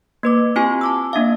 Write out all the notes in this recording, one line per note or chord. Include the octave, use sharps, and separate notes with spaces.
A#3 B4 D6
C4 E4 F4 G4 G#5 C#6
A5 D6 E6
A#3 D4 E5 F5